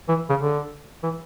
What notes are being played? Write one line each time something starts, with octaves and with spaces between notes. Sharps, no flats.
E3
C#3
D3
E3